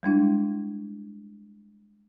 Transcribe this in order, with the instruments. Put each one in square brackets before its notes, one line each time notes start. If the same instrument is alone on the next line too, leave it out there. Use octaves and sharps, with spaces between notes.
[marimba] G3 G#3 D4 E4